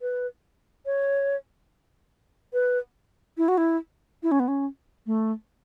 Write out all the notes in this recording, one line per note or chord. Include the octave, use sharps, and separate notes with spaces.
B4
C#5
B4
E4
F#4
E4
E4
C#4
B3
C#4
A3